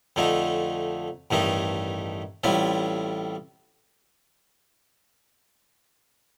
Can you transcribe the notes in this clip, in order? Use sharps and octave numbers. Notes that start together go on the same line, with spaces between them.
F2 D3 A3 D#4
A1 G2 D#3 A3 D#4
A1 A2 G3 C4 F4